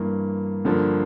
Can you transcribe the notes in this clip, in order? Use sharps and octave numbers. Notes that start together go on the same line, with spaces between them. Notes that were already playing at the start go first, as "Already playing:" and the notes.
Already playing: G2 E3 A#3
G2 D3 F3 A#3